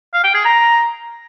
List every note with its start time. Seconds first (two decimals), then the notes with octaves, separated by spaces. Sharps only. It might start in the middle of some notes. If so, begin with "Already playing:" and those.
0.14 F5
0.24 G5
0.35 G#4
0.45 A#5